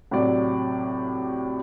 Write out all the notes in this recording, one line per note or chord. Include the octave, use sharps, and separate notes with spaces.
A2 C3 F#3 D5